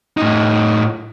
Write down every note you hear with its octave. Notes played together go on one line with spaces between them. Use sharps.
A2 D#4